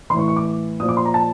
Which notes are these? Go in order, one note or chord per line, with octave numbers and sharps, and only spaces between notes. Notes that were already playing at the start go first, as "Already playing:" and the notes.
A2 E3 C6 C#6
C#6
D6
A#2 F3 D#6
D6
C6
A#5
A5